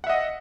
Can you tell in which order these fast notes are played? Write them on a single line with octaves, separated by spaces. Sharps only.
F#5 E5 D#5